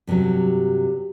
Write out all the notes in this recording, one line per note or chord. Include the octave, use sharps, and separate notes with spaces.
G2 C3 D#3 F#3 G3